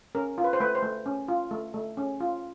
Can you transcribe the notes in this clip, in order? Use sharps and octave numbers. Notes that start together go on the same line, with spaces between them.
C#4 A#4
F4
B4
C5
A3 B4
C5
A3
C#4
F4
A3
A3
C#4
F4